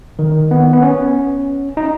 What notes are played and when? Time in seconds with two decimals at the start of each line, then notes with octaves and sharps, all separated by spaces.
0.19 D#3
0.51 B3
0.73 B3
0.82 C#4
1.77 D#4